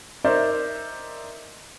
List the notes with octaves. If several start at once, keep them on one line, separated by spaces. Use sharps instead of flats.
D#4 A#4 C5 D5 E5